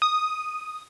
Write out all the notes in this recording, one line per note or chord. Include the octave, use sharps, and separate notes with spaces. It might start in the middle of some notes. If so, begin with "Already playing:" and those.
D#6